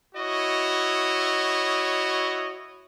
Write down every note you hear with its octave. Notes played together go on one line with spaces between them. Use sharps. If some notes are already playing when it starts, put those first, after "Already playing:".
E4 F#4 C#5 D#5